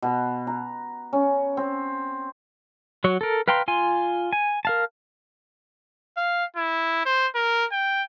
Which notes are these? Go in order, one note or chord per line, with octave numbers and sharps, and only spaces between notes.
B2
A#5
C#4
C4
F#3 F#4 C#5
A4 A#4
B4 F5 G5 A#5 C6
F4 G#5 C6
G#5
A#4 F5 A5
F5
E4
C5
A#4
G5